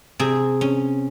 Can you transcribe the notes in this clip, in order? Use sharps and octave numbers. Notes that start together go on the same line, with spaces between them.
C3 G#4
C#4